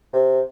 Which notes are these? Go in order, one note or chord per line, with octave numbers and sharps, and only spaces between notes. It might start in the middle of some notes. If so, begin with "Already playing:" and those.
C3